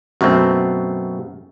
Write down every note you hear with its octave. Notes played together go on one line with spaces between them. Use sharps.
F#2 B2 A3 C4